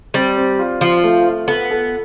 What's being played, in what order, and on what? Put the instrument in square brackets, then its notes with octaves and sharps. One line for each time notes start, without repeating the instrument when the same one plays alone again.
[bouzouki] G3 [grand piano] C4
[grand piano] C4
F4
[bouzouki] F3 [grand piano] F4
[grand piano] A3
F4
[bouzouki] B3 [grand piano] A4
[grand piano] A4